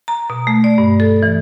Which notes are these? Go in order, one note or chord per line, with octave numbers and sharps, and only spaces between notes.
A#5
B2
A3
D5
G2
A4
E3